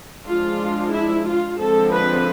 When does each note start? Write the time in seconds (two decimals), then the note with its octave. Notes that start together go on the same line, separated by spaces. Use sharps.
0.25 F3 G#3 D4 F4
0.92 E4
1.26 F4
1.58 D3 F3 G#3 C4 A4
1.92 B4